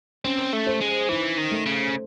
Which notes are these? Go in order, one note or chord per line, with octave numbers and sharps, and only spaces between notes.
C4 C#4
A3
C5
G#3
E3 D#4
D#3
A3
C#3